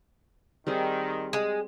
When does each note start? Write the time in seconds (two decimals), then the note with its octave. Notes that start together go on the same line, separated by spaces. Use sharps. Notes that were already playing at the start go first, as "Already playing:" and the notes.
0.67 D#3 G3 C4 G#4
1.33 G#3